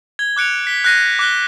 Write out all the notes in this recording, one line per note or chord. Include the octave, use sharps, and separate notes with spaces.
G#6 G7
D6 F#6 C#7 D7 F7
B6 G7
F#6 G6 A#6 C7 D#7
D6 F#6 G7